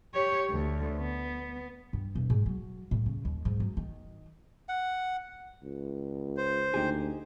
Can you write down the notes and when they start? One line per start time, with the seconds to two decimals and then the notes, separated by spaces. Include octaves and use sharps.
0.14 G4 C#5
0.50 D2
0.97 B3
1.93 G2
2.15 E1
2.30 G#2
2.46 F#3
2.91 A2
3.06 C#3
3.25 D#2
3.45 G#2
3.60 F#2
3.77 D#3
4.69 F#5
5.63 C#2
6.37 C5
6.74 D2 D#4 G4 G#4